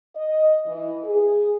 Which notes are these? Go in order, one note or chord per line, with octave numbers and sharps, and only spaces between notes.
D#5
E3
G#4